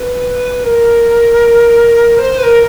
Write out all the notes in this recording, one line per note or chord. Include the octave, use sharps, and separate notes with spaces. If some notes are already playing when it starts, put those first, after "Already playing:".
Already playing: B4
A#4
C5
B4
A#4